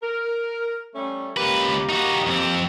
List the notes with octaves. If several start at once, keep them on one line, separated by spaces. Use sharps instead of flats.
A#4
G3 A3 C#4
C#2 A#3 G4 B4
D#4 F#4
F2 C4